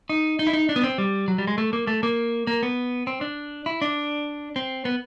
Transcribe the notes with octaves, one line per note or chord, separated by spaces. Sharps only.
D#4
D#4
E4
D#4
D4
B3
C4
G3
F#3
G3
G#3
A3
A#3
A3
A#3
A#3
B3
C4
D4
E4
D4
C4
B3